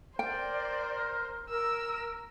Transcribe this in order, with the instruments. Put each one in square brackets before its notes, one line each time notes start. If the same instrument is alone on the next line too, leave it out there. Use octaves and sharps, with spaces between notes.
[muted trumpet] A#4 [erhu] C5 [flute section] D5 [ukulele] G5
[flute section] A#4 [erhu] E6